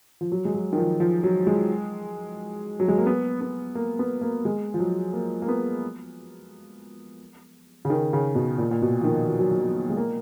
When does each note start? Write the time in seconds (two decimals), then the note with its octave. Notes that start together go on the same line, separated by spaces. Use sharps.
0.21 F3
0.32 F#3
0.45 G#3
0.54 F#3
0.73 D#3
0.77 F3
1.00 F3
1.23 F#3
1.47 G#3
2.80 F#3
2.88 G#3
2.98 A#3
3.06 B3
3.41 B3
3.75 A#3
3.99 B3
4.21 A#3
4.45 G#3
4.74 F3
4.80 F#3
5.13 A#3
5.42 A#3
5.48 B3
7.85 C#3
7.90 D#3
8.13 C#3
8.35 B2
8.58 A#2
8.71 A#2
8.82 B2
9.01 F3
9.04 D#3
9.28 F3
9.39 F#3
9.50 F3
9.62 F#3
9.90 G#3
9.97 A#3